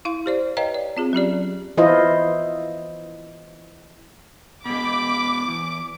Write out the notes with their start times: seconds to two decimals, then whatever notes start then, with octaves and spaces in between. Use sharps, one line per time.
0.05 E4 F5 C6
0.26 G4 C5 D5
0.57 B4 C#5 D#5 F5 G5 A#5
0.74 D5
0.97 C4 F4 G#4
1.13 F#3 C#4 G4 D5
1.77 E3 E4 F4 C5 D#5
4.65 B2 G#3 B5 D6
5.48 E2